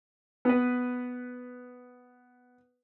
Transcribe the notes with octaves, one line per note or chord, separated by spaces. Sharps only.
B3 B4